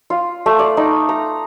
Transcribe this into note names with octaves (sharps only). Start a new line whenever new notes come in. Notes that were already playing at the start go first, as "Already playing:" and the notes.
F4
A3
D5
D#4
A#5